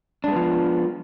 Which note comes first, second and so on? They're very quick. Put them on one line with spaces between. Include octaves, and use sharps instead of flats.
D4 G#3 B3 F3